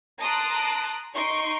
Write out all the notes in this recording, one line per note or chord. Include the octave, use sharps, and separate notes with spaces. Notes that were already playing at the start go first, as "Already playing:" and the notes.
A5 A#5 C6 D#6 F#6 D7
D#4 C6 C#6 D7